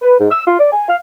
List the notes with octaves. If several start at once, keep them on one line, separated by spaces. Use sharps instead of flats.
B4
G#2
E6
F4
D5
G#5
F5